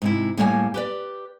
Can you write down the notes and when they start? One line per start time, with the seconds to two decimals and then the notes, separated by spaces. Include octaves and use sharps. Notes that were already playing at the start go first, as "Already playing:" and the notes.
0.02 G#2 C3 E4
0.37 A2 G3 A#3 C#5 E5 G#5
0.74 G4 B4 D5